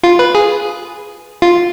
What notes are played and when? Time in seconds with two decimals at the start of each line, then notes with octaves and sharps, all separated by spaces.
0.03 F4
0.19 B4
0.35 G#4
1.42 F4